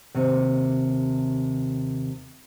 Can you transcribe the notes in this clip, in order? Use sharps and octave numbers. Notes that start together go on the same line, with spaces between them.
D#2 C3